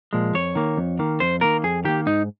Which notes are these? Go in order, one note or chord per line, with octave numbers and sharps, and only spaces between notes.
A#2 F3 G#3
F2 C#5
D#3 A#3
F2
D#3 A#3
F2 C5
D#3 A#3 A#4
F2 G#4
D#3 A#3 G4
G#2 D#4